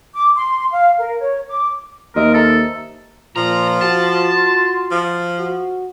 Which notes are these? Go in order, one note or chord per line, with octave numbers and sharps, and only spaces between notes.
D6
C6
F5
A#4
C#5
D6
D#2 A#4 C5 D#5 E5
A4 E5 A#5
A#2 F3 F4 A#5
F#4 A5
F3
F#4